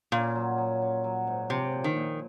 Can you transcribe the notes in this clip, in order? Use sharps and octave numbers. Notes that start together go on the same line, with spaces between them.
A#2 C#4
F#3
F#3
C#4
F#3
G#2
C3 F3
A#2
D#3
A#2